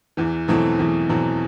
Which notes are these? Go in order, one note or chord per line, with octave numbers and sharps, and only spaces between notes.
E2 E3
B2 E3 F#3 A3 C4
E2 E3
B2 E3 F#3 A3 C4